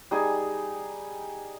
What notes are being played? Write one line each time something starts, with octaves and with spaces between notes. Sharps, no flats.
G3 D#4 G#4 G#5